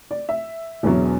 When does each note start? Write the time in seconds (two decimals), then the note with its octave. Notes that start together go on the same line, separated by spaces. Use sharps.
0.11 D5
0.29 E5
0.83 E1 E2 B2 F#3